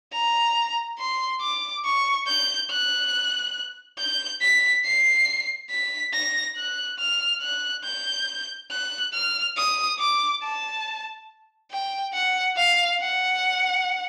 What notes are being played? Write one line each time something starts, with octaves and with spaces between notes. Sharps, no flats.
A#5
C6
D6
C#6
G6
F#6
G6
B6
C7
B6
A#6
F#6
F6
F#6
G6
F#6
F6
D#6
D6
A5
G5
F#5
F5
F#5